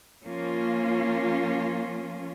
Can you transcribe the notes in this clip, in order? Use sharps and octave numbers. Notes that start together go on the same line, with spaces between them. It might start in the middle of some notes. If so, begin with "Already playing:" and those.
F3 A#3 C#4 F4